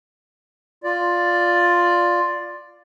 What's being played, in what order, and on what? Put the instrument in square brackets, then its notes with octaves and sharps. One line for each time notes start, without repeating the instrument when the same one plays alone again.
[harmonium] F4 D5